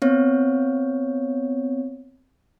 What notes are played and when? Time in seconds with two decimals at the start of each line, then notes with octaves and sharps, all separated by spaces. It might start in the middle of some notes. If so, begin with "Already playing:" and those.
0.02 B3 C4 C#5